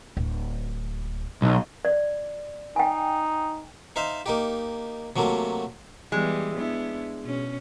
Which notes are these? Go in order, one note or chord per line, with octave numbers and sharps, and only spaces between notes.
D1
B1
D5
D#4 G5 G#5
D#4 C5 E5 F5
A#3 D#4 G4
C3 F#3 A3 A#3
E3 G3 G#3 B3
B3 D4 E4
B2 C#4